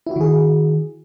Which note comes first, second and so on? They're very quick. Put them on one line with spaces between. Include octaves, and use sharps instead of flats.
E4 F#4 D#3 G#4